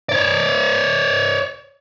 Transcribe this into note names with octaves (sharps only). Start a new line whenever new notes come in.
C#5 D5